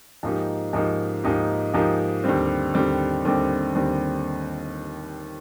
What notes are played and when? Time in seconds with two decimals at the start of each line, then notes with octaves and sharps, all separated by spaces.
0.23 G#2 F3 A#3 D#4 G4
0.73 G#2 F3 A#3 D#4 G4
1.24 G#2 F3 A#3 D#4 G4
1.74 G#2 F3 A#3 D#4 G4
2.24 D#2 D3 G3 C4
2.74 D#2 D3 G3 C4
3.25 D#2 D3 G3 C4
3.75 D#2 D3 G3 C4